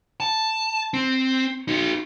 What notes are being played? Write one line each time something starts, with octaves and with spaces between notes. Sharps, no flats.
A5
C4
D#4 F#4